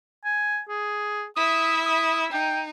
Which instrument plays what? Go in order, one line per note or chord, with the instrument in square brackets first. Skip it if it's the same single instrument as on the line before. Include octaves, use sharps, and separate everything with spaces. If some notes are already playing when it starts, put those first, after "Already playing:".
[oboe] G#5
G#4
[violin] E4 E5 [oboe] D#6
[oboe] D#6
[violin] D#4 [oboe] G5